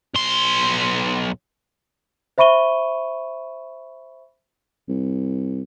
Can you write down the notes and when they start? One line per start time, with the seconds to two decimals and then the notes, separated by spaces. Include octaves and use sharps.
0.15 B1 C6
2.38 C5 E5 B5 C#6 D#7 G7
4.88 C2